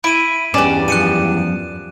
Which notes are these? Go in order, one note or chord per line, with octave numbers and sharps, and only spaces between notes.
E4 D7 D#7
E2 G2 C#4 B4 D5 E7
F#2 F3 F#6 C#7 D#7